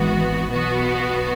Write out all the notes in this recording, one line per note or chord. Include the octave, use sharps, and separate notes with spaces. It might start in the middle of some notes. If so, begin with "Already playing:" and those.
Already playing: G#1 G#2 E3 B3 F#4
B1 B2 B3 F#4